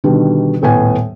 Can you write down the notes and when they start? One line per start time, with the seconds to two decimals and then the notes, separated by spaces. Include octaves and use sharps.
0.04 B2 D3 D#3 G3
0.62 D#1 A2 B3 G#5